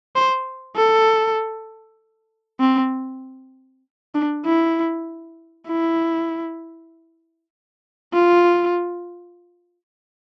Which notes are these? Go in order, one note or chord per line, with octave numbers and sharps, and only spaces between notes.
C5
A4
C4
D4
E4
E4
F4